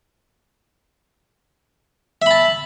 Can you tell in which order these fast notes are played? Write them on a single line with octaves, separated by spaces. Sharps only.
E5 B5 A5